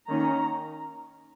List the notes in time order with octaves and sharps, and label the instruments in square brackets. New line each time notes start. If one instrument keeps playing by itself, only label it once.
[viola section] D#3 A#3 C#4 A#5